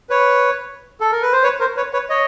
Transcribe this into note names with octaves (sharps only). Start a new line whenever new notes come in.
B4 C#5
A4
A#4
B4
C5
B4 C#5
A#4 C5
B4 C#5
B4 C#5
C#5 D#5